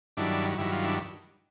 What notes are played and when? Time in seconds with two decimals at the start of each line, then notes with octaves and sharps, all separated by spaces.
0.17 G2 D#3 F#3 D4 E4
0.58 G2 D#3 F#3 E4
0.72 F4
0.84 D4 E4